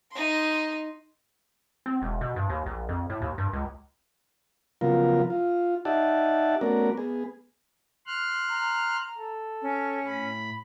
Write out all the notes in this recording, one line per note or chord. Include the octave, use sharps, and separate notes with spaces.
D#4 C6
C4
E1
B2
G2
D#2
A#1
F2
A2
D#2
G2
C#2
C#3 F3 F#3 B3 F4 A#4
F4
D#4 G4 D5 E5 F#5 A5
A3 B3 C#4 F#4 A#4 D5
B3 G#4
C6 F6 F#6
A#5
A4
C#4
A2 B5